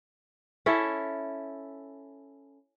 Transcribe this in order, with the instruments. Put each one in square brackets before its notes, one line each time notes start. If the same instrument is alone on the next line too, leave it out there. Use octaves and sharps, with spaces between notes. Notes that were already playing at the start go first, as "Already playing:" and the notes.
[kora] C#4 E4 A4 E5